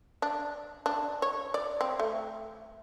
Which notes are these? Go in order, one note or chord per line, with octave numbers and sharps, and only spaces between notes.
D4
D4
C#5
D5
C4
A3